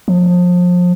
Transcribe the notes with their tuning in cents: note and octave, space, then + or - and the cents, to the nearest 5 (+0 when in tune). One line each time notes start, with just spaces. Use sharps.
F3 +30